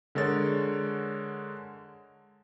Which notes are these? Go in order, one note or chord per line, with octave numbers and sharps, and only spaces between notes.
D3 G#3 A#4 C#5 A6